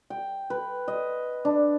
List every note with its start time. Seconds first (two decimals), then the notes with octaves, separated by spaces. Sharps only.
0.10 G5
0.50 B4
0.88 D#5
1.45 D4